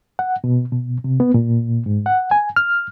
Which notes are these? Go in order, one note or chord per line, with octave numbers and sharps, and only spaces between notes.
F#5
B2
B2
C3
B3
A#2
G#2
F#5
G#5
F6